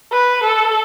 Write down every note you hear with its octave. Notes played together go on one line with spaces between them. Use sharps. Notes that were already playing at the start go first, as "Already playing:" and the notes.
B4
A4